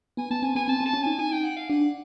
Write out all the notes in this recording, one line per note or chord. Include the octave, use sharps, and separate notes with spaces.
B3 G#5
B3 A5
C4 G#5
B3 G#5
C4 A5
C4
A5
C#4
D#4 G#5
D#4 G#5
G5
F#5
F5
D4 F#5